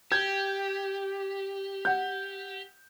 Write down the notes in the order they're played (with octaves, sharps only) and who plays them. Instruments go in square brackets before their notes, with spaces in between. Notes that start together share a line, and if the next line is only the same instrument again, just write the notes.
[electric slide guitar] G4 [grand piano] G6 G#6
[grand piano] F#5 G6